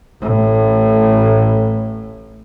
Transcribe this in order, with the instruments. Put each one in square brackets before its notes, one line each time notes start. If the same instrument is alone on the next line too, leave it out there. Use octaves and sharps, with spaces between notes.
[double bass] A1 A2